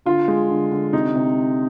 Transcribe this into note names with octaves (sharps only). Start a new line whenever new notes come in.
D3 F4
G#3
D3
D3
C3 D#4
C3